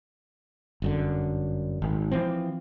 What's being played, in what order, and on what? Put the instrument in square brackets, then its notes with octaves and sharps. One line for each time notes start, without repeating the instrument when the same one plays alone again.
[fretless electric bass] G1 F#2 D3
G#1
E3 F3 C4